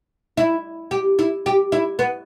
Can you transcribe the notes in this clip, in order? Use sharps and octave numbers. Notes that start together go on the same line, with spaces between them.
E4
G4
E4
G4
E4
B3